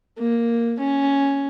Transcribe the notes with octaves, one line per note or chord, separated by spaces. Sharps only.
A#3
C#4